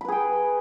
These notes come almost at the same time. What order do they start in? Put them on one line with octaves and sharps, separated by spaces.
B5 B4 G#4 G5